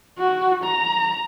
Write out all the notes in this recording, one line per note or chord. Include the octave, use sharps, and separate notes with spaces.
F#4
A#5